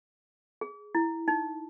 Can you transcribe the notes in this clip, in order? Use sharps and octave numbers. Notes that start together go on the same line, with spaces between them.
G#4
E4
D#4